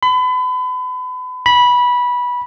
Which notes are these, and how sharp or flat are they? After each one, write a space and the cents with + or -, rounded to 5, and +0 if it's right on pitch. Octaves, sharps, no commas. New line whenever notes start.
B5 +35
B5 -15